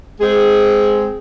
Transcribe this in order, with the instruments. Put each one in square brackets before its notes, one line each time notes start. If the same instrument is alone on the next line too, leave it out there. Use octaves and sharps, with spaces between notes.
[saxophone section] G#3 C4 G#4